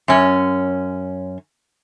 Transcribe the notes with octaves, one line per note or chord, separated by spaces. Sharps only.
F#2 C#4